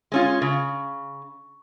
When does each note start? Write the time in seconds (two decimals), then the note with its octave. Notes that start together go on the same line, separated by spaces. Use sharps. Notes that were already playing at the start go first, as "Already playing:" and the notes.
0.12 G#3 C#4 F4
0.42 C#3